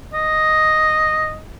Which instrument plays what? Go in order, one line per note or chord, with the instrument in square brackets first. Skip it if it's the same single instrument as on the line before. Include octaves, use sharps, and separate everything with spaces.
[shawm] D#5